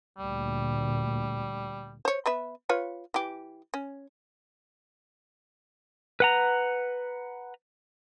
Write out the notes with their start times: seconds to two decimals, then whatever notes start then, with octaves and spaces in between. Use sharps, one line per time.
0.18 D2 A#2 G3
2.05 C5 C#5
2.26 B3 B4 E5
2.69 F4 B4 C#5
3.14 E3 G4
3.74 C#4
6.20 B4 F#5 A#5